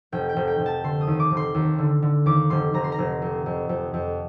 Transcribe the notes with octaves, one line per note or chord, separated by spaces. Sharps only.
F1 G5
G5
F1
G5
F1
A5
D3 C6
D#6
D#2
D6
F1
C6
D#2
D3
D3
D#2 D6
F1 C6
F1 A#5
C6
A#5
F1
F2
F2
F2
F2